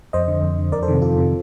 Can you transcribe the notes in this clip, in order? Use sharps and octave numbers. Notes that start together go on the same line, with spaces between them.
F2 C5 D#5
D3
F2
D3
F2 A#4 D5
A4 C5
C3 D#3
F2 F4 A4
C3 D#3